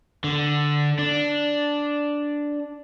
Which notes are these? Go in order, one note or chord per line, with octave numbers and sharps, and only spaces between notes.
D3
D4